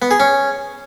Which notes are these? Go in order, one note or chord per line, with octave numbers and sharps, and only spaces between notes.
B3
G#4
C#4